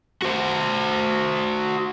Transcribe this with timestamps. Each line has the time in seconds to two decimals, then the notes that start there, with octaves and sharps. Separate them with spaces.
0.22 F#4 C5